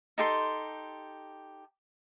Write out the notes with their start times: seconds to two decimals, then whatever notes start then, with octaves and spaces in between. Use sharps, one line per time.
0.18 D#4 G4 A4 C6